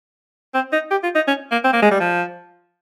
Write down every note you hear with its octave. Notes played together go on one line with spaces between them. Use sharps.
C4
D#4
G4
F4
D#4
C#4
A#3
C4
A#3
G#3
G3
F3